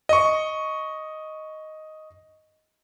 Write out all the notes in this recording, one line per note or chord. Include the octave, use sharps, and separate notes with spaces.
D#5 C#6